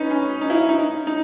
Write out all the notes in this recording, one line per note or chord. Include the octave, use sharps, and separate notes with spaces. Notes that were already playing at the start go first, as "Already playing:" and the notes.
Already playing: C#4 D#4 B4
C#4
D#4
E4
D#4
D#4